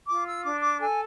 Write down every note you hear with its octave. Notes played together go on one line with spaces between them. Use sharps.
F4 D6
E6
D4 D6
D6
A4 G#5